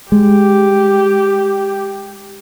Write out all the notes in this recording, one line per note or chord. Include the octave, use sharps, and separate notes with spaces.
G#3 G4